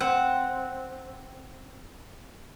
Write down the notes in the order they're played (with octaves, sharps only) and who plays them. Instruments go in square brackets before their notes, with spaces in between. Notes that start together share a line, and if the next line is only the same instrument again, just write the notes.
[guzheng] C4 [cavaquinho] F#5